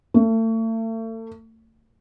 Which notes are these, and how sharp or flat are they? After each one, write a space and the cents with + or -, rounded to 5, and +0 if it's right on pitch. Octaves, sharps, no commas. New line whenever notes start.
A3 +35